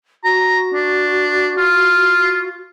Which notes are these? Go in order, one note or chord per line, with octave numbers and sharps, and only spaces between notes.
F#4 A#5
D4
F4